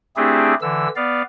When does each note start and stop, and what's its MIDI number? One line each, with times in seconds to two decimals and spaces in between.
0.16 0.54 57
0.16 0.54 60
0.16 0.54 62
0.16 0.54 64
0.16 0.54 67
0.16 0.54 68
0.62 0.88 50
0.62 0.88 52
0.62 0.88 88
0.96 1.22 59
0.96 1.22 74
0.96 1.22 77